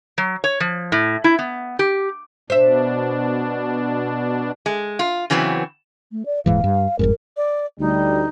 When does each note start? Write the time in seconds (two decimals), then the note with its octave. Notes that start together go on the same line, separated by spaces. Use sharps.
0.18 F#3
0.44 C#5
0.60 F3
0.92 A2
1.24 E4
1.39 B3
1.79 G4
2.50 B2 D4 C5 E5
4.66 G#3
4.99 F4
5.30 C#3 E3 F#3 B3 C4
6.12 A3
6.26 D5
6.46 D#1 G#2 E3 F5
6.64 G2
6.99 G1 F2 G#2 A#4
7.37 D5
7.80 D2 G3 D#4